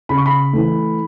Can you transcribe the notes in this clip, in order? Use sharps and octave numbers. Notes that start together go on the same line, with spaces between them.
C#3 B5
C#6
B5
E3 A3